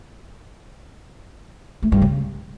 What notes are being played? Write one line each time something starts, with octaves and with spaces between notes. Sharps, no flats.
A3
G2
C#3